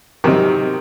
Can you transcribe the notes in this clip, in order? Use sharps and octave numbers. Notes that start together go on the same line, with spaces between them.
G#2 C3 D#3 F#3 C4 D#4